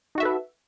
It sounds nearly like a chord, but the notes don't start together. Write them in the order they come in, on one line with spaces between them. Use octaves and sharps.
D#4 F#4 E5 A4 B4